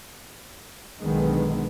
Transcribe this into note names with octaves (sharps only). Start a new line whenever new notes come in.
B1 D3 D#3 G#3 B3